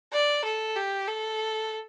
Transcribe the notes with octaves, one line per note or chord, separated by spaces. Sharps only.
D5
A4
G4
A4